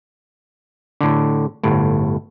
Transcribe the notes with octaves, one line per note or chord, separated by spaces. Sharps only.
A2 D3
G1 A2